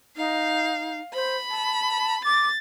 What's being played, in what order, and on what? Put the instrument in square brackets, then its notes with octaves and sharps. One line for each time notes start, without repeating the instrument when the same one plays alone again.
[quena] D#4 [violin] F5
[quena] C5 [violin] B5
[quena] A5
[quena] D6 [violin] A6